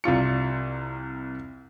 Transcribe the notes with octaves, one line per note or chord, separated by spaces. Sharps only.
C2 C3 F4 C#7